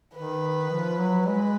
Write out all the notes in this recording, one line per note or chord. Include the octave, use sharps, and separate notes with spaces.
D#3 B4
F3
F#3
G#3 B4